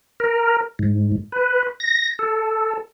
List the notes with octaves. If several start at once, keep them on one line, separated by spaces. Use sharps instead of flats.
A#4
G#2
B4
A#6
A4